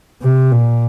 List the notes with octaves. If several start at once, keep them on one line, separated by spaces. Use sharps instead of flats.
C3
A#2